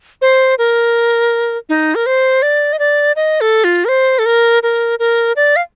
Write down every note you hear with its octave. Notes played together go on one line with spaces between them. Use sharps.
C5
A#4
D#4
A#4
C5
D5
D#5
D5
D#5
A4
F4
A#4
C5
A4
A#4
A#4
A#4
D5
F5